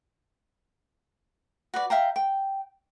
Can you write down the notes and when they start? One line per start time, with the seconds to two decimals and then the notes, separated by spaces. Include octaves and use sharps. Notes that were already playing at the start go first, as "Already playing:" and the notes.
1.74 F#4 B4 D5
1.90 E5 F5 G5 A#5
2.16 G5